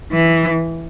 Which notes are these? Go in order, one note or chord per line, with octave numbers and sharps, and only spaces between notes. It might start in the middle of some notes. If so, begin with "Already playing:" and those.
E3